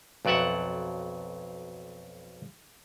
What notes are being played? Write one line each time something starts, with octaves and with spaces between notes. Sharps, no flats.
B1 F2 F#3 D5 E5 F#5